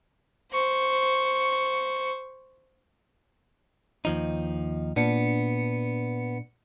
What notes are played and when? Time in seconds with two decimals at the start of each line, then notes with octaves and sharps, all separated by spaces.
0.52 C5 C#6
4.05 D#2 F3 D#4
4.96 A#2 B3 D4 C#7